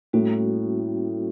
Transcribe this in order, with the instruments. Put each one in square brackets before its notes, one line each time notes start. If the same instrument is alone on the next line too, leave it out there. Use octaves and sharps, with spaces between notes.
[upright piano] A2 [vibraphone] G3 A#3 C#4 F#4